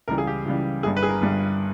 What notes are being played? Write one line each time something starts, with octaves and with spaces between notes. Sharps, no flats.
C#2 C#3 E3 G3 A#4
G#4
G4
C#2 C#3 E3 G3
G1 G2 G3 G#4
B4
G#4
A#4
G1 G2 G3